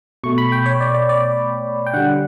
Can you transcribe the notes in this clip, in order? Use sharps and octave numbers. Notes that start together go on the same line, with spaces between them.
B2 A3 C#6
B5
G5
C#5
D5
D5
D5
G5
D3 G3 F#5